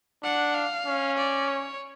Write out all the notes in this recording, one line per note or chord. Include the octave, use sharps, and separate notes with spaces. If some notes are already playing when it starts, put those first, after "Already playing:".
D4 F#5
F5
C#4
D5
C#5